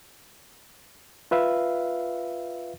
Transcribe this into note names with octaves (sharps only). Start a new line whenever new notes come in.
F4 B4 E5 F5